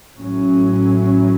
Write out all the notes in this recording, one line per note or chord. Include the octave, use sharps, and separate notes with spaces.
A1 A2 F#3 C#4